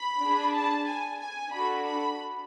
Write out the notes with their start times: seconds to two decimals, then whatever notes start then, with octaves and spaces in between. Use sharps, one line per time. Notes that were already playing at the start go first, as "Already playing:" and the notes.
Already playing: B5
0.21 D4 G#4
0.55 A5
0.87 G#5
1.20 G#5
1.51 D4 F#4 A4 B5
1.85 B5